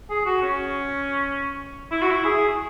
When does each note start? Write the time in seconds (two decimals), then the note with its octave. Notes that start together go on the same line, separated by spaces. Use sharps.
0.10 G#4
0.26 F#4
0.42 C#4
1.91 E4
2.02 F#4
2.10 E4
2.25 G#4